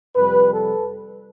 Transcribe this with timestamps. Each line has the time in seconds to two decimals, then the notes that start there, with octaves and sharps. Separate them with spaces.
0.16 F2 C3 G3 B4
0.52 A4